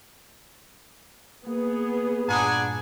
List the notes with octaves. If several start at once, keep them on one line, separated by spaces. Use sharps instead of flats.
A#3 B3 G#4
G2 A#2 D4 F#5 G#5 A#5 B5 D#6